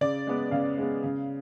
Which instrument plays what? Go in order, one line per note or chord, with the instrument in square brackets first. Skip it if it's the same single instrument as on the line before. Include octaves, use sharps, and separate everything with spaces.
[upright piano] C#3 D5
G#3 B3
C#3 F5
G#3 B3
C#3